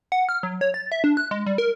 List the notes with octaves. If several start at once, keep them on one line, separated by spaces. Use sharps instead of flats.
F#5
F6
F#3
C#5
A6
E5
D4
F#6
G#3
G3
A#4